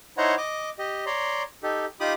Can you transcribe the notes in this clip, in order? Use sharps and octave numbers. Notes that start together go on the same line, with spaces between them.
D#4 E4 C5 C#5 F#5 A#5
D#5 D6
G4 D#5
C#5 D5 A#5 C6
D#4 G4 A4
D#4 F4 G4 B5 D6 D#6